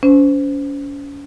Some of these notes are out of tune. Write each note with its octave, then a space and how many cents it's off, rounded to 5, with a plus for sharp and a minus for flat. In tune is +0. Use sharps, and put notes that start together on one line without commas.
C#4 +35 C5 -25